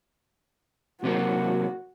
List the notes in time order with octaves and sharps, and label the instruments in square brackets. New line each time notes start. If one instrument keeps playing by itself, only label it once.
[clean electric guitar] C3 F#3 A#3 [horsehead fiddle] F#4